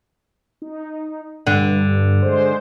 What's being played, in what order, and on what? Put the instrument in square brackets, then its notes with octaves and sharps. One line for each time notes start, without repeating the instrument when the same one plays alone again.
[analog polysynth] D#4
[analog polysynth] G2 [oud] D3
[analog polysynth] G#3 C5